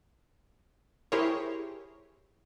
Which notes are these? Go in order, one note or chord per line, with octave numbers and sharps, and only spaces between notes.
E4 G4 G#4 A#4 C5 C#5